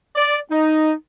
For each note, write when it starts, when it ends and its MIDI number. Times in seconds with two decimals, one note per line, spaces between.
0.15 0.37 74
0.50 0.91 63